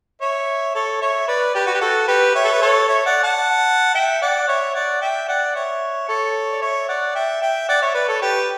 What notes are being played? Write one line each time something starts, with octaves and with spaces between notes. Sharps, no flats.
C#5 E5
A4 C#5
C#5 E5
B4 D5
G4 B4
F#4
G4
F#4 A4
G4 B4
C#5 E5
A4
B4
A4 C#5
C#5 E5
D5 F#5
F#5 A5
E5 G5
D5 F#5
C#5 E5
D5 F#5
E5 G5
D5 F#5
C#5 E5
A4 C#5
D5
C#5 E5
D5 F#5
E5 G5
E5 G5
D5 F#5
C#5 E5
B4 D5
A4 C#5
G4 B4